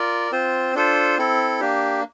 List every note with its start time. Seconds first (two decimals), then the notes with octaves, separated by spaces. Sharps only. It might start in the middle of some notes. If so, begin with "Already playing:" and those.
Already playing: F4 A#4 D5
0.32 C4 F4 C5
0.75 D4 F4 A4 C5
1.18 C4 E4 A4
1.60 A#3 D4 G4